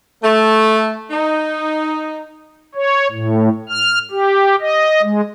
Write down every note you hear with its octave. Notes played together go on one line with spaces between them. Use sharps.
A3
D#4
C#5
A2
F6
G4
D#5
G#3